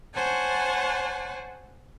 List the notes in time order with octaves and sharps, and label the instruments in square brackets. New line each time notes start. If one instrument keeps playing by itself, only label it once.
[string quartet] C5 C#5 F#5 G#5 A5